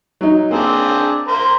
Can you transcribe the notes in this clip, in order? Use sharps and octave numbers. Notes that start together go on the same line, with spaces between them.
F#3 D#4
A#3 C4 D4 G#4
A#4 C5 A#5